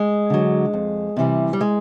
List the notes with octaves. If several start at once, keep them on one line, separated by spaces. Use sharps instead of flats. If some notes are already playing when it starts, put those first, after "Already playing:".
Already playing: G#3
D3 F#3
F2
C3 E3 G3
G3
G#3